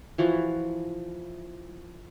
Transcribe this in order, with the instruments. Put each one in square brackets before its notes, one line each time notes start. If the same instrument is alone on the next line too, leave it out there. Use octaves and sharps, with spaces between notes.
[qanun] E3 F3 F#4